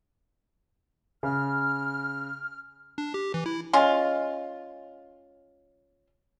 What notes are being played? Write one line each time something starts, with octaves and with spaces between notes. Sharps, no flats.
C#3 F6
D4
G4
E3
E4
G#3 C#4 F4